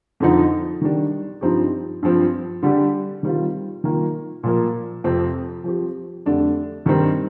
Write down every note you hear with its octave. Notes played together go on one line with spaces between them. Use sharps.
F2 D3 F3 C4 D#4
D#3 G3 D4
G2 F3 C4 D#4 G4
G2 F3 C4
D3 G3 D4 G4
D#3 G3 C4 F4
D#3 A#3 F4
A#2 F3 A#3
F2 C3 F3 C4
F3 C4 G4
F2 D3 A3 D4 G4
G2 D#3 G3 C4 D#4